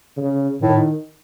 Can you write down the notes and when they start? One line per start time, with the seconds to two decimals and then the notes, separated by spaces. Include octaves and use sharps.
0.17 C#3
0.62 A2 D#3